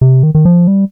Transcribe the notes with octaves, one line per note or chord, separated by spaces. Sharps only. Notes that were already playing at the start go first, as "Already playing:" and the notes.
C3
D#3
D#3
F3
G3